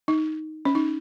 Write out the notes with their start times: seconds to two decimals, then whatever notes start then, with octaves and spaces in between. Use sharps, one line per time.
0.08 D#4
0.65 C#4
0.75 D#4